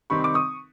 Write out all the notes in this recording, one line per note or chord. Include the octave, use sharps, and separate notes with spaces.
C3 D#3 G3 C4 D#4 B5 C#6
D6
C#6 D#6